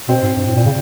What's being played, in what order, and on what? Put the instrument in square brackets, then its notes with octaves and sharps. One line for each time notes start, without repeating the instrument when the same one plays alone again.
[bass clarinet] B2 [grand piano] C4
[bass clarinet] G#2
G2
A2
A#2
C#3